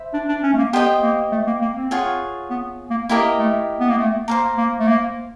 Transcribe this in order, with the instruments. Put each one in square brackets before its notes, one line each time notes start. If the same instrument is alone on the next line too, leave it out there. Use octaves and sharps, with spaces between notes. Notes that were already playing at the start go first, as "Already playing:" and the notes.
Already playing: [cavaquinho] C5 E5 B5
[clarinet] D4
D4
C#4
A3
A#3
[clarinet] B3 [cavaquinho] G4 C5 D#5 G5
[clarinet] A#3
A3
A#3
A#3
C4
[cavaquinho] F4 G#4 C#5 F#5
[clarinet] B3
A#3
[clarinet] A#3 [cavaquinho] E4 G4 A#4 D#5
[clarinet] A3
B3
A#3
A3
[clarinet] A#3 [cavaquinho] C5 F5 A#5
[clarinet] A#3
A3
A#3